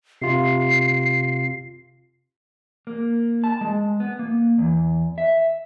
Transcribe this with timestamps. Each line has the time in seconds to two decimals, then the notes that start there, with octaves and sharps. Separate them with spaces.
0.22 C3 F4 C7
2.87 A#3
3.44 A5
3.61 G#3
4.00 B3
4.19 A#3
4.58 E2
5.18 E5